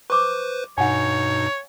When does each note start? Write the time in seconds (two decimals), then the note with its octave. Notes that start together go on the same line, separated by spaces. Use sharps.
0.10 B4 C5 C#6 D6
0.78 G2 B2 D#4 C#5 F#5 G#5